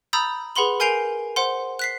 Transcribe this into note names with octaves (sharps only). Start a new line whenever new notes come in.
A#5 B5 D#6 E6 G6 A6
G#4 B4 F#5 B5 C6 F#7
A#4 G#5 G6 C7 D7 F7
C5 F#5 C6
F#6 B6 C7